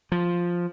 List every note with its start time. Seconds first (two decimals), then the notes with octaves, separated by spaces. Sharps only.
0.12 F3